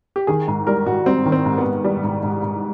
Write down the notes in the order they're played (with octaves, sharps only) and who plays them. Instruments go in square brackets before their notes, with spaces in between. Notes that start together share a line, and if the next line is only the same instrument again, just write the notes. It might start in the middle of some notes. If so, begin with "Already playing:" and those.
[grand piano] G4
[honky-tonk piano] D#3 [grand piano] G#4
[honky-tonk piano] G#2
[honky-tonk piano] G3 [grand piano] A#4
[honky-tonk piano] G#2 [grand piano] F#4
[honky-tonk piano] G3 [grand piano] C4
[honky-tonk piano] D#3
[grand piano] C4
[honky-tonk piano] G#2
[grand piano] B3
[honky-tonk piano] G#2
G3
G#2
G#2
G#2